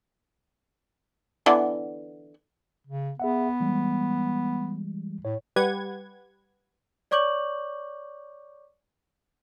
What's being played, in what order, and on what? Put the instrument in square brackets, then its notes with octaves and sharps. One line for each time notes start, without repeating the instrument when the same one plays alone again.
[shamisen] D3 E3 B3
[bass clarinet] C#3
[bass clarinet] B3 [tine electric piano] G#4 E5 F#5
[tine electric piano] E3 G3 G#3
[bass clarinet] A2 [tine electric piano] C#5
[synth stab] G3 G4 B4 F#5 G#6
[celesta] C#5 D5 C#6 D6 G6 F#7